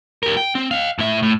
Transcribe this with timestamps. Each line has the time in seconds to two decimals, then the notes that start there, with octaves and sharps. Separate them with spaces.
0.23 G4 A#4
0.37 G5
0.55 C4
0.71 D#5 F5
0.99 A2 E5
1.23 A2